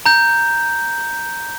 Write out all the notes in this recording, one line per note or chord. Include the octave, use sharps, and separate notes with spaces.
A#5 G6